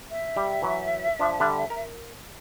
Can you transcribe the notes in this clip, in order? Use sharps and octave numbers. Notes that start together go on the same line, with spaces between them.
E5
G3 G4
E3 F#3
F3 D4
D3 G3 D4
A#4